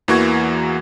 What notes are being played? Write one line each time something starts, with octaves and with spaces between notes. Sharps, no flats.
E2 E3 A#3 F#4 C#6 G#6